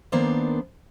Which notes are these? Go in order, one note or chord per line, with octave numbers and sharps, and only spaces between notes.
D#3 A#3 B3 D4 C5 D5